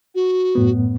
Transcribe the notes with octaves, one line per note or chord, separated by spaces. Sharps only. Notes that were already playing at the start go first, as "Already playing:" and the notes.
F#4
F#2 A2 B3